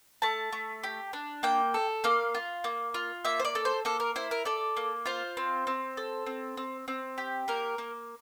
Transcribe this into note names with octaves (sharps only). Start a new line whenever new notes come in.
A3 A5
A3
G4
D4
A#3 G5
A4
A#3 F5
F4
A#3
F4
A#3 E5
C5
D5
A4
C5
A#3 A4
A#4
E4 C5
A#4
A4 D5
A#3
F4 C5
C4
C4
A4
C4
C4
C4
G4
A#3 A#4
A#3